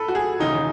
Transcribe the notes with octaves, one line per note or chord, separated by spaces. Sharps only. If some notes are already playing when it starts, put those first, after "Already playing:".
Already playing: E3 A4 B4
F#4
G#4
E1 D#2 C#3 E3 D#4